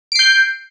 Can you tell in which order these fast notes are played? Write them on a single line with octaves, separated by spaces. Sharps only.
D7 C7 G6